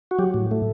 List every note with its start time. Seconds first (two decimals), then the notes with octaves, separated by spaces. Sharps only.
0.11 F#4
0.19 F#3 G4
0.34 A2
0.51 A3